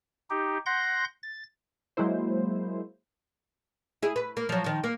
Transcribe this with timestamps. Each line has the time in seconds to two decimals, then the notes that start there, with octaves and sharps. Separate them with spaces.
0.30 D#4 G4
0.66 F#5 C6 G6 A#6
1.23 A6
1.97 F#3 G#3 A#3 E4 C5
4.03 E4 G#4
4.16 B4
4.37 A#3
4.49 F3 F#3
4.64 D#3 F3
4.84 A#3